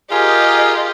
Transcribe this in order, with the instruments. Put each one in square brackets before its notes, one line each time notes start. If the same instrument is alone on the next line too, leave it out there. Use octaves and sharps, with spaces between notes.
[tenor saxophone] F4 [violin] G4 D#5 [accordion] G#4 A#4 G#5